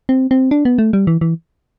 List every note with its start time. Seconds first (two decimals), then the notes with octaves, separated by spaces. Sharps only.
0.09 C4
0.31 C4
0.51 D4
0.65 B3
0.78 A3
0.93 G3
1.07 E3
1.21 E3